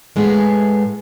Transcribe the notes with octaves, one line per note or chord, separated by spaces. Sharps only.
A2 G#3 A3 B3 G4 G#4